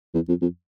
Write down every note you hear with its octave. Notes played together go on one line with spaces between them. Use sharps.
E2
F2
F2